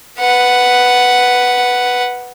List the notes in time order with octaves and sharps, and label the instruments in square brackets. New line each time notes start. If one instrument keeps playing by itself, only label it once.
[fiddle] B4 F#5